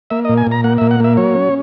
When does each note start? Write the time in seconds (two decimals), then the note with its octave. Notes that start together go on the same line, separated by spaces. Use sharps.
0.10 A#3 E5
0.25 A#2 D#5
0.37 G#5
0.47 A#2 A#5
0.64 A#3 F#5
0.78 A#2 E5
0.91 F#5
1.00 A#3 E5
1.17 F#3 C#5
1.35 C#4